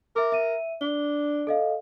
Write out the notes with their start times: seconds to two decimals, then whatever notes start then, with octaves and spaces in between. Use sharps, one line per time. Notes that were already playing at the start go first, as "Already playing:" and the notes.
0.16 A#4 E5 D6
0.32 E5 D#7
0.81 D4 G7
1.47 A4 D#5 F5